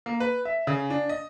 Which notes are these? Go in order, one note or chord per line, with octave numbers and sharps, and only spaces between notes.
A#3
B4
E5
C#3
D4
D#5